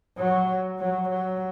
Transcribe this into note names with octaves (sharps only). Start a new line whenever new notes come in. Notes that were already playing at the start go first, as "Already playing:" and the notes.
F#3
F#3
F#3